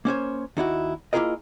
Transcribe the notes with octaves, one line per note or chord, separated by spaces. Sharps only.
A#3 C#4 C5 C#5
D#2 D#4 E4 F#4
A#3 E4 F4 G#4 A#4 D#5